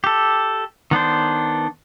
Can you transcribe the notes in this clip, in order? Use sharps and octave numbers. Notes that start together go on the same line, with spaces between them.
G4 A4
D#3 B3 D4 C5